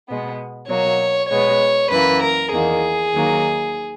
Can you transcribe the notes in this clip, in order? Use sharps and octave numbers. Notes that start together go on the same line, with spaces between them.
B2 G#3 B3
B2 F#3 A#3 C#5
B2 G#3 B3 C#5
F#2 E3 A#3 B4
A#4
E2 D#3 A#3 G#4
D#2 D#3 F#3 A#3